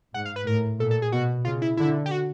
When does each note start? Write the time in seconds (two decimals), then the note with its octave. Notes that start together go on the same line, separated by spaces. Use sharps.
0.14 G#2 F#5
0.25 F5
0.36 B4
0.46 A2 A#4
0.79 A#2 A4
0.91 A4
1.02 G#4
1.12 B2 F#4
1.45 C#3 F4
1.62 E4
1.77 D3 E4
2.06 G4
2.11 F#4